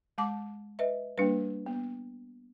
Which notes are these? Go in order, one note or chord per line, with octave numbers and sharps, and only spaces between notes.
G#3 A5 D6
B4 D#5 E5
G3 A#3 D4 B4
B3